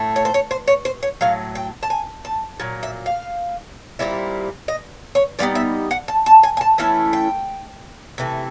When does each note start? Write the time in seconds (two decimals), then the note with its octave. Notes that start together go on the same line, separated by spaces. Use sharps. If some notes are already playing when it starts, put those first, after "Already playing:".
Already playing: A2 A3
0.16 C#5
0.25 C5
0.34 C#5
0.51 C5
0.68 C#5
0.85 C5
1.03 C#5
1.21 A2 F#3 F5
1.55 G5
1.83 A5
1.90 G#5
2.25 A5
2.60 A#2 F#3
2.83 E5
3.06 F5
3.99 A#2 G3 C4 E4
4.68 D#5
5.15 C#5
5.39 D3 G3 B3 D#4 D5
5.55 E5
5.91 F#5
6.08 A5
6.26 A5
6.43 G#5
6.57 G#5
6.61 A5
6.78 E3 A3 C#4 E4 A5
7.13 G5
8.18 C3 E3 A3